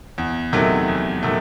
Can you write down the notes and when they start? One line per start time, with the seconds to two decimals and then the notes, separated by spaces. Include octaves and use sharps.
0.18 E2
0.53 C3 D#3 F#3 A3
0.88 E2
1.23 C3 D#3 F#3 A3